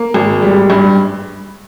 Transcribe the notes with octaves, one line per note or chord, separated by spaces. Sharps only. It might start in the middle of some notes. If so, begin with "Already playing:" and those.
Already playing: A#3
G#1
G3
G2